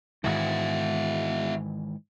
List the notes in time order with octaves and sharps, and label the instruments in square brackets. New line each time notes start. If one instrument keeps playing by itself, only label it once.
[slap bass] G#2 D#3 E3 [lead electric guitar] E4 F#4